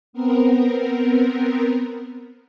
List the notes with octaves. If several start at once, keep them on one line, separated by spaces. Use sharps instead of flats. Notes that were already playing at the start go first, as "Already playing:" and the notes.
B3 C4 A#4